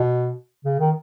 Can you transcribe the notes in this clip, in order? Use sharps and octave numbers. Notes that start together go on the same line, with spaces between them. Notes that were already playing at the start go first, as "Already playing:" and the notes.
Already playing: B2
C#3
D#3